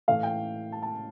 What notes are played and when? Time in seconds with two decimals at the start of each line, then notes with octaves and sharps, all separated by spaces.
0.08 A2 E3 A3 F5
0.23 G5
0.72 A5
0.82 A5